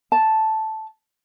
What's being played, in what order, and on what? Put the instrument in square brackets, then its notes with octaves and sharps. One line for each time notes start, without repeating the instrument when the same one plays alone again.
[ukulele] A5